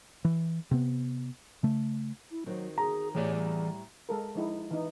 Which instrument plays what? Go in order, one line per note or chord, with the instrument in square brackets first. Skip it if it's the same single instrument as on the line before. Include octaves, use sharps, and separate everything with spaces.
[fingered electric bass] E3
C3 B3
C#3 A3
[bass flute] E4
[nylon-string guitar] D#3 C4 F#4 [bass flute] F#3
[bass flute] G#4 [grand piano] A#5
[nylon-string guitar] A2 G4 [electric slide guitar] E3 G#4 D5 [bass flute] C#5
[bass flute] G3
[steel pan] G#3 A4 A#4
F3 G#3 D#4 E4
E3 D#4